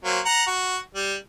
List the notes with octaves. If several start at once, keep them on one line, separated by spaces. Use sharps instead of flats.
F#3 A#3 C4
F#5 A#5
F#4
G3